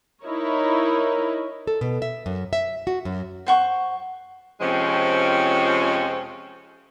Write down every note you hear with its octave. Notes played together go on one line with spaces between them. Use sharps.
D#4 E4 A#4 C#5
A4
B2
E5
F#2
E5
F#4
F#2
C5 F#5 C#6
F2 C3 F3 G#3 C4 C#4